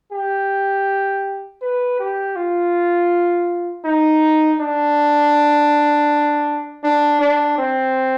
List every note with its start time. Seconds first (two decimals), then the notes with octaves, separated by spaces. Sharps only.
0.12 G4
1.62 B4
1.99 G4
2.36 F4
3.85 D#4
4.60 D4
6.84 D4
7.21 D4
7.58 C4